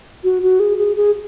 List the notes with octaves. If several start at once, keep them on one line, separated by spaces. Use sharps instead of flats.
F#4
F#4
G#4
G#4
G#4